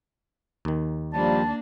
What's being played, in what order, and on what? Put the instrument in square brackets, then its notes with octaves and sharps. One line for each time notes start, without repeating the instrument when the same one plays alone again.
[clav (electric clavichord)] D#2 D#3
[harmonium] F3 G3 [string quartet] A#3 D4 [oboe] A5